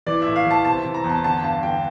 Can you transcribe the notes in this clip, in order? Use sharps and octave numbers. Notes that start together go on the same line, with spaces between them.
E3 D5
A2 E5
F5
E3
A5
C3 A5
E3
A#5
E2
A5
D3 A5
G2 A5
D3 G5